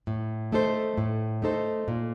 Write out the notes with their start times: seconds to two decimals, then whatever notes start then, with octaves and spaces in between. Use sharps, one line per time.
0.07 A2
0.52 A3 D#4 A4 C5
0.98 A2
1.42 A3 D#4 A4 C5
1.88 A#2